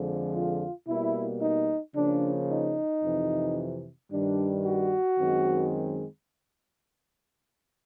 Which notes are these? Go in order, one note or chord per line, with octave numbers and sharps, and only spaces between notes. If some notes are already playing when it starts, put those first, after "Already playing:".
Already playing: F2 D3 F3 G#3
F4
B2 G3 A#3 E4
D#4
C#3 F3 A#3 D4
D#4
F2 C3 E3
G2 D#3 G3 D4
F#4
F#2 D#3 G#3 C4